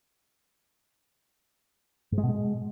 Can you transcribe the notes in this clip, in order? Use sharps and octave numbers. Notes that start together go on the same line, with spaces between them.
G#2
G#3
B2
G#3